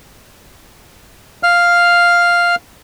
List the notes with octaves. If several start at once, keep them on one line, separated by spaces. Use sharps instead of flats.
F5 F6